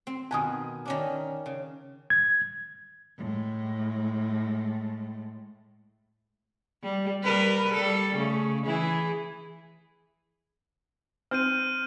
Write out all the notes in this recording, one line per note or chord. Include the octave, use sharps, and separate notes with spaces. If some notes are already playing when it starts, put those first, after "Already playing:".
C4
B2 D#3 B4 G#5 D#6
D#3 C#4 D4
C#3
G#6
A2 G#3
G3
G3 A#4 B4
G3 A4
C#3 A3
E3 E4 G#4
C4 F6 G6 D#7